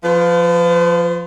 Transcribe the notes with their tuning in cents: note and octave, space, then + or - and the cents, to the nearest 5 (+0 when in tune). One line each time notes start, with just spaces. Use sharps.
F3 +5 B4 +45